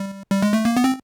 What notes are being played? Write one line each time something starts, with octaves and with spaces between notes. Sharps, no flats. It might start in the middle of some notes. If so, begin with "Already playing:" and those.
Already playing: G3
G3
G#3
A3
A#3
B3
C4